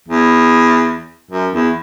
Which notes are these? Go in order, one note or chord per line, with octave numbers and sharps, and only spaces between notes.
E2
F#2
E2